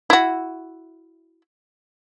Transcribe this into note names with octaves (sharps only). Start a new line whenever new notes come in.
E4 F#4